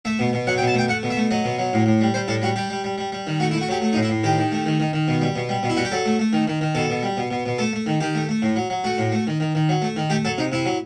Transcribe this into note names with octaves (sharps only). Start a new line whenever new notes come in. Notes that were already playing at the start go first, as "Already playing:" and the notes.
A3 E5
B2
B2
F#3 F#5
G5
B2
A5
A3 G5
A3 F#5
B2
E5
A3
F#3 D#5
B2
F#3
A2
A2
G3
G3 C5
A2 A4
G3 F#4
G3 G4
G3
G3
G3
G3
D#3
A3 F#4
E4
A3
F#4
F#3 G4
A3
D#4
A2
E4
A2
D#3 G4
D#3
A3
D#3
D#3
D#3
B2
G3
B2
G3
B2
E4
G3 F#4
G4
F#3 A4
A3
A3
D#3
D#3
D#3
B2 A4
B2
G3
B2
B2
B2
A3 A4
A3
D#3
D#3 G4
A3
A3
A2
F#3
F#3
A3 F#4
A2
A3
D#3
D#3
D#3
F#3
A3
D#3
A3 G4
F#3 A4
C3 D#4
C3 E4
F#3